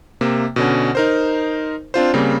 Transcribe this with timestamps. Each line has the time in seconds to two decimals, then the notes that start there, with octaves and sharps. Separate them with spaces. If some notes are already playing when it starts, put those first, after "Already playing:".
0.21 C3 A#3
0.56 B2 D3 C#4
0.95 D#4 A#4 C5
1.94 C4 D4 F4 C5
2.13 C#3 G3 A#3 C4